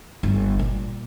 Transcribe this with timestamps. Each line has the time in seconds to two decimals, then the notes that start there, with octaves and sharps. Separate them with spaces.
0.23 G1
0.59 A#2